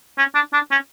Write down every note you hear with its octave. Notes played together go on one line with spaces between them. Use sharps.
C#4
D4
D4
C#4